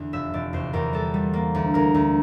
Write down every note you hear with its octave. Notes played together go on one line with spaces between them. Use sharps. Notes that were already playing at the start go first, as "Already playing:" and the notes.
Already playing: E2 D3
F1 E5
F1 D5
E2 C5
E2 A#4
G3 A4
G3
A#3
D2
D2 A#4
D2